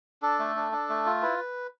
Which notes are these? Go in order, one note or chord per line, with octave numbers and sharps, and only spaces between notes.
D4 A4
A3
D4
D4
A3
F4
E4 B4